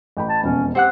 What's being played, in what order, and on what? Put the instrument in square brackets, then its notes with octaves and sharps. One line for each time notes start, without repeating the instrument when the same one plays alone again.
[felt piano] A1 G5 B5
[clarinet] A5
[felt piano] E1 F2 B2 [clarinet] C#4
[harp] C4 F#5 F#6 [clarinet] G4 [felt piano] C5